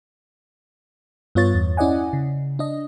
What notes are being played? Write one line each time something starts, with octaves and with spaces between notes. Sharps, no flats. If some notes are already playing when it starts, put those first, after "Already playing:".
G2 B3 F4 C#5 A6
E2
C#4 E4 D5 D#5 F#5 G#5
C#3
D4 D#5